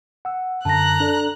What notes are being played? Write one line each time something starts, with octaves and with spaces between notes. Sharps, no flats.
F#5 E6
F#2 D3 A5 A#5 F#6 A#6
D4 A4 D5